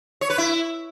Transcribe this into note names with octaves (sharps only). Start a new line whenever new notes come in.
C#5
B4
E4